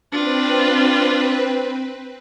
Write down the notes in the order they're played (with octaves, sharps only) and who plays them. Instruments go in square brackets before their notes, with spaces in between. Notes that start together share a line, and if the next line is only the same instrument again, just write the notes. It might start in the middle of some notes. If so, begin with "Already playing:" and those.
[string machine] C4 B4 [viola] D4 F4